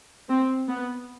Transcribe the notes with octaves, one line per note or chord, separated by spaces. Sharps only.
C4
B3